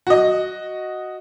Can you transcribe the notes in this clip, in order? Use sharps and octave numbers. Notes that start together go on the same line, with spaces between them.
F#4 D#5